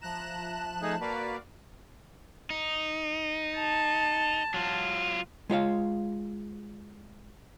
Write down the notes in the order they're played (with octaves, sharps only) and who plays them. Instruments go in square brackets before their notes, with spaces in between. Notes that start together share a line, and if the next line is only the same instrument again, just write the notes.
[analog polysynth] F3 F#6 E7 [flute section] E5 A5 [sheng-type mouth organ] A#5
[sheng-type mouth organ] A3 D#4 G#4
[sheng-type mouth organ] A#3 B4 [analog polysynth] F#4 D5 F5
[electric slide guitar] D#4
[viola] A5
[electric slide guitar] F#3 F4
[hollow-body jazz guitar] G#3 F4 C#5 F5